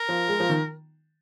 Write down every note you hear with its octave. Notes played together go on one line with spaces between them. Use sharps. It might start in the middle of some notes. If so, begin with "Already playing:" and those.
Already playing: A#4
F3
G#3
F3
D#3